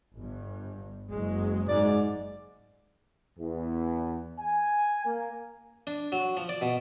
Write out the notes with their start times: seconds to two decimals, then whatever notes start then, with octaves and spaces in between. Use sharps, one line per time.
0.16 G1 G2
1.12 F#1 F#3 G#3
1.69 G#2 D5
3.37 E2
4.38 G#5
5.05 A#3
5.87 D4
6.12 F#3
6.37 F3
6.49 D5
6.61 B2